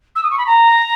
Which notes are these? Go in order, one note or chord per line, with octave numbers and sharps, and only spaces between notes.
E6
D#6
C#6
B5
A#5